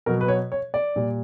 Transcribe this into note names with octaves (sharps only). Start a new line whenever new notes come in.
B2 F#3 A#4
B4
C#5
C#5
D5
A#2 G3